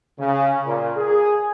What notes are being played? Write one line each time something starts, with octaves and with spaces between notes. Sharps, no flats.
C#3
A#2
G#4